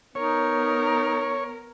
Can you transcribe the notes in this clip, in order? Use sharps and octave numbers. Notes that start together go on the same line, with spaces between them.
B3 D#4 A#4 C#5